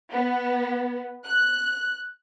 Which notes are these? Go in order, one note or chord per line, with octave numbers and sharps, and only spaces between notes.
B3
F#6